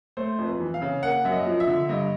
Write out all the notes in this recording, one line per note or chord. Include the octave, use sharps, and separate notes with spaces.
A3 C5
F2
B4
E3
F5
C#3
A#3 F#5
F#2 E5
D#5
F3
E5
D3
G2 D#5